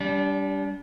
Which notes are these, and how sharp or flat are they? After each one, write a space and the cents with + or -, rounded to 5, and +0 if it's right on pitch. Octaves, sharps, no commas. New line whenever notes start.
G3 +0 D4 -35